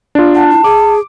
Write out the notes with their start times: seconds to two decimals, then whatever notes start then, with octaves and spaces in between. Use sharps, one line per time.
0.15 D4 F4
0.35 F#5 A5
0.50 E4
0.64 G#4 D6